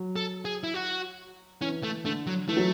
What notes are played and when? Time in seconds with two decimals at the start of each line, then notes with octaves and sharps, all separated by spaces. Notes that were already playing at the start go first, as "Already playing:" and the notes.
Already playing: F#3
0.16 A4
0.45 G#4
0.63 E4
0.74 F#4
1.61 E3 C#4
1.83 A3
2.05 D3 A3
2.27 F#3
2.48 E3 A3
2.57 F#3